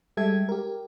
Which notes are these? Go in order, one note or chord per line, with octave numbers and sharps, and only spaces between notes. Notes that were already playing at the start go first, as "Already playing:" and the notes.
G3 G#3 G4 A4 E5 G#6
G4 A#4